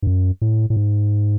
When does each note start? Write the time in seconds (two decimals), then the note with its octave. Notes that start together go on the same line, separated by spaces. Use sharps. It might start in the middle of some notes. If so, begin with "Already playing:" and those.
0.02 G2
0.07 F#2
0.42 A2
0.70 A2
0.76 G#2